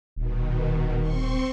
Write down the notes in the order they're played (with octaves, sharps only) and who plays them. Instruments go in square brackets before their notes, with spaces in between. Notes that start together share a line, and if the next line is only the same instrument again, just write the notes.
[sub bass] D#1 [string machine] B2 D#3
[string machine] C4 C6 C#6